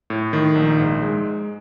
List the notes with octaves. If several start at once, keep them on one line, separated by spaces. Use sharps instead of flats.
A2
D#3
A#1
G#2
G#3